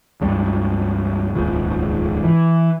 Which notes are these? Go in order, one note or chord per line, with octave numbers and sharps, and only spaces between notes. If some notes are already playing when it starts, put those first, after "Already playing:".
C#2 G2 G3
D#1 C#2 G#2
E3